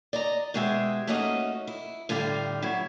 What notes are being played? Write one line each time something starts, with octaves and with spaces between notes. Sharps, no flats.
D5 D#5 A#5
B2 G#3 G4 G#4 E5
A3 A#3 C#4 D#4 F#4 D#5
E4
A2 D3 G3 D5 F5
F#3 E4